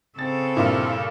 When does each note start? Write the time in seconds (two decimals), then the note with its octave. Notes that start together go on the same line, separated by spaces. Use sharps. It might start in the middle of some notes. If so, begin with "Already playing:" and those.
0.19 C#3 C4 A4 A6
0.57 G2 A#2 E4